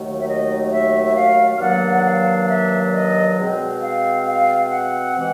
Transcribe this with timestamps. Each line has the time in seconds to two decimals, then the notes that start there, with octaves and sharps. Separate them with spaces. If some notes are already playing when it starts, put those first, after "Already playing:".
Already playing: D#2 D#3 F#3 A3
0.19 E5
0.27 D#5
0.72 E5
1.04 E5
1.15 F5
1.56 F5
1.59 G2 D#3 F#3 A#3 D4 F#5
1.95 F#5
2.04 F5
2.42 F5
2.48 E5
2.85 D5
2.93 D#5
3.37 B2 G#3 C4
3.81 F5
4.26 F5
4.69 F#5
5.14 C3 E3 G#3